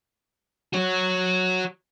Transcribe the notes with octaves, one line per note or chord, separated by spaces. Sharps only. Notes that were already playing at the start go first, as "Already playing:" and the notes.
F#4 C#5